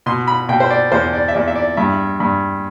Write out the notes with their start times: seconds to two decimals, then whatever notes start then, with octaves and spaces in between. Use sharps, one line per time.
0.06 B2 C6
0.27 B5
0.49 B2 G5
0.60 C5
0.70 D5
0.92 E2 C5
1.13 D5
1.28 E5
1.34 E2 D5
1.47 E5
1.55 D5
1.77 G2 E5
2.20 G2